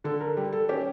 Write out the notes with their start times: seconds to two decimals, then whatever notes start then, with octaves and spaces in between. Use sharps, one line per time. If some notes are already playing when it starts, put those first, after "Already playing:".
0.04 D3 A4
0.21 A#4
0.37 G3
0.53 A4
0.69 C#4 G4